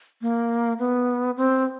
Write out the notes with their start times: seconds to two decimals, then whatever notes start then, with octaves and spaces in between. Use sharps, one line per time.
0.22 A#3
0.79 B3
1.37 C4